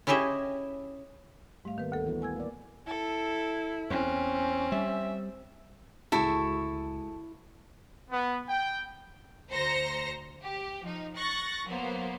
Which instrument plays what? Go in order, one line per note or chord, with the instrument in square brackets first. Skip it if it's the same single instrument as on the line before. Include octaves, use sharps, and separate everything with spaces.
[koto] C#4 E4 G4 G#4 D#5 E5
[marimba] G#2 F5 [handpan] G3 A3
[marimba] D#3 B4 [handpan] A#3 B3
[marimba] D2 A4
[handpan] E3 B3 F#4
[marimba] G#5 E6 G#6
[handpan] A#3 D5
[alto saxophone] E4 [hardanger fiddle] A4
[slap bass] E2 [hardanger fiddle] C4 [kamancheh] C#4
[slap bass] G3 [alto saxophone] E5
[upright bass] D1 C#2 [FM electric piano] G#3 F#4 G#4 [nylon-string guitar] E4 [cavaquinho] A4 C#6
[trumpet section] B3
G5
[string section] D2 C5 A#5 A#6 C#7
G4
F3 D#4
C#6 F#6 A6 A#6
F#3 A#3 B3 C5